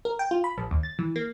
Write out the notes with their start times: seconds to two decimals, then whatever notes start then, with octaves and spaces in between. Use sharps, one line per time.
0.05 A#4
0.19 G5
0.31 F4
0.44 B5
0.58 A#1
0.71 D#2
0.83 A6
0.99 E3
1.16 A#3